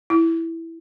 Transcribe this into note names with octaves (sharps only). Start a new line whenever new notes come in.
E4